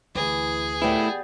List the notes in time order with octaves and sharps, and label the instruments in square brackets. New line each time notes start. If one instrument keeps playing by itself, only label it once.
[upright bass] D2 [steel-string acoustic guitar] E3 [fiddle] G#4
[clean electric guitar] A3 E4 [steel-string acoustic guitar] B3 G4 D5